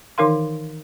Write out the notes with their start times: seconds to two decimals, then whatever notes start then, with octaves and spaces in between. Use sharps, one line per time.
0.18 D#3 E3 D#4 A#4 F5 C6